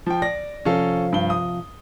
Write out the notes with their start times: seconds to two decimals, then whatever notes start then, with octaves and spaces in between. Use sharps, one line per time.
0.06 F3 G5
0.22 D5 A#6
0.65 C3 F3 C#4 A4 F5
1.13 G2 G7
1.30 D#6